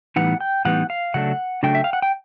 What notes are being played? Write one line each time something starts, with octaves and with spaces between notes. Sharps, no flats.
A2 E3 G3 B3 D#4 F#5
G5
A2 E3 G3 B3 D#4 F#5
F5
C#3 F#3 A3 D4 F#5
C#3 F#3 A3 D4 G5
E5
F5
F#5
G5